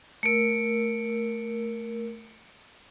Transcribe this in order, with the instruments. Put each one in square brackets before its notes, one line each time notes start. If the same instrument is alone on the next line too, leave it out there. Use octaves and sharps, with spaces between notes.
[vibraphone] A3 A#4 E6 [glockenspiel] C#7 D7